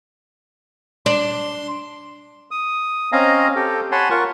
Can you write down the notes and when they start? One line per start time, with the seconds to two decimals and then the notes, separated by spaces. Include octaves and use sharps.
1.06 D4 C6
2.51 D#6
3.12 C4 C#4 D#5 F5 G#5 A#5
3.56 G4 A4 G5
3.92 C#5 F#5 G#5 A5 B5 C6
4.10 F4 A#4 F#5 C#6